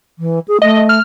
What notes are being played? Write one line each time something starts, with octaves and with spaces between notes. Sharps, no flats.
E3
G#4
A3 D#5
F6